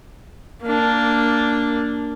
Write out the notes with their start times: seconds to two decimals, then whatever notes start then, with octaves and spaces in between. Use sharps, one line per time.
0.63 A#3 D4